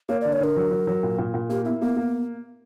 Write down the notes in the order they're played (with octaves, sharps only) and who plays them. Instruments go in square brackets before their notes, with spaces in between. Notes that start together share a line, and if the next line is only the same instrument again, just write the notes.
[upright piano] A#3 [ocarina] C#5
[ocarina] D5
[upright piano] D3
[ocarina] C#5
[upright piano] D3 [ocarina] A#4
[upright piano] F#3
F#3
F#3
A#2
A#2
A#2
[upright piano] A#3 [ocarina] G4
[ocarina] B3 [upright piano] E4
[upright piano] A#3 [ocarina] B3
[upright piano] A#3